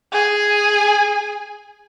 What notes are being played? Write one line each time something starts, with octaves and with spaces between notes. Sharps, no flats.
G#4 G#5